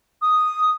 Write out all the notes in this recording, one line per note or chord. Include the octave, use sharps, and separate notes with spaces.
D#6